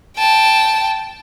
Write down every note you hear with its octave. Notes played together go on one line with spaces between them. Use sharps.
G5 A5